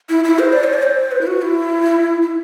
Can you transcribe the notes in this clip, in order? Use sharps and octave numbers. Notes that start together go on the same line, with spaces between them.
E4
E4
C5
D5
C5
D5
C5
B4
E4
F#4
E4
E4